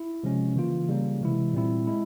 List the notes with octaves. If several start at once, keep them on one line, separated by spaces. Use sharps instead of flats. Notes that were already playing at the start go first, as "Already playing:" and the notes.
Already playing: E4
C3 F3 G#3 C#4
C#3 E3 A#3 F4
C#3 G3 A#3
C3 E3 G#3 E4
A#2 G3 C4 E4
G#3 E4